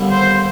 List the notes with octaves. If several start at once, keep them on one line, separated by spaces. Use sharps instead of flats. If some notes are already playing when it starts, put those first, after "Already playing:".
Already playing: D#2 D3 G3 B3
C5